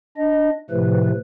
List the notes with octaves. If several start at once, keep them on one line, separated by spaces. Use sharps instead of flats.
D4 D#5
A2 C3 F3 A3 B4